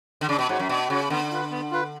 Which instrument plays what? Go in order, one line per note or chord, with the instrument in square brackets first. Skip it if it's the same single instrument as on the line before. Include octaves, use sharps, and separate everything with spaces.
[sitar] D3
[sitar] C#3 [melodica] D4
[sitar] B2
[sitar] G#2 [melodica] F#4 C#5 F#5
[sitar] F#2
[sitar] B2 [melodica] D4
[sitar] C#3 [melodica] F#4 C#5 F#5
[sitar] D3 [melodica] B3
[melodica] F4 B4
B3
F4 B4